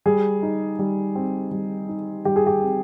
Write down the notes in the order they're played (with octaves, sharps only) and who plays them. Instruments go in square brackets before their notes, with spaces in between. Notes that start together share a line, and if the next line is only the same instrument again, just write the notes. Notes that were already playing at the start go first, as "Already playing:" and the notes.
[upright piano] G3 G#4
D#4
G3
C4
G3
D#4
G3 G4
G#4
G4
C4